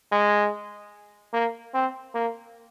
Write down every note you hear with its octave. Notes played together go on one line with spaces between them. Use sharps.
G#3
A#3
C4
A#3